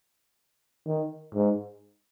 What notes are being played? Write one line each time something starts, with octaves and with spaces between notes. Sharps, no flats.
D#3
G#2